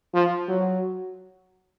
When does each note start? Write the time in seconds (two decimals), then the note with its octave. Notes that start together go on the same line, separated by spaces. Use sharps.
0.14 F3
0.48 F#3